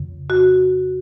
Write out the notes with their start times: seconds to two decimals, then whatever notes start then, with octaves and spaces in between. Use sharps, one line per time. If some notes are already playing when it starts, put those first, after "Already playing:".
Already playing: F2 C#3
0.30 F#4